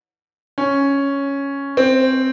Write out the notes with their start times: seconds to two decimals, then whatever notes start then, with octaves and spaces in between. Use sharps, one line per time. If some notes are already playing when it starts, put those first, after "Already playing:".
0.58 C#4
1.77 C4